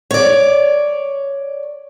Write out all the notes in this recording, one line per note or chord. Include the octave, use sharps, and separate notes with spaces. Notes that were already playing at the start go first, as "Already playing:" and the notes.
C#5 D5